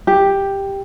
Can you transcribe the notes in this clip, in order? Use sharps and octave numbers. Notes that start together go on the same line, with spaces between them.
G4